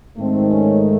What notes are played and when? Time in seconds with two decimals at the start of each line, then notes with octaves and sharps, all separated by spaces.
0.17 G#2 D#3 A3 C4
0.50 C#4